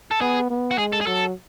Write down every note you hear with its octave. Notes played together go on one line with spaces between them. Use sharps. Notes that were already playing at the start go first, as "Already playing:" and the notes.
A4
B3 G#4
B3
F#4
G#3 G#4
A4
G#4
F#3 A4